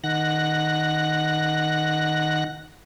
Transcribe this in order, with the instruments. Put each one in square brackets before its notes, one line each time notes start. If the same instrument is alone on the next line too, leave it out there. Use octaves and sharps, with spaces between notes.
[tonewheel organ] D#3 F#5 F#6 A#6